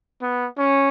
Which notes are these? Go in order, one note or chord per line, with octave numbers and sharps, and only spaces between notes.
B3
C#4